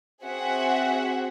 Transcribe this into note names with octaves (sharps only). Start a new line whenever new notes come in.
C4 F#4 G#4 E5 F#5